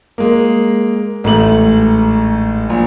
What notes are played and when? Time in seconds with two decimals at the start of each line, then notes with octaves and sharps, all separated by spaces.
0.18 G#3 A#3
1.24 A1 G#2 A3 F#7
2.70 A#1